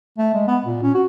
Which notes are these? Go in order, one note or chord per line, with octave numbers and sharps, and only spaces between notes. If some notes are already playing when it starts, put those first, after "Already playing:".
A3
G#3
B3
A#2
C#4
F#4